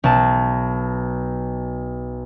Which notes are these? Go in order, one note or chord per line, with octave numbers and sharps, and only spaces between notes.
B1 A5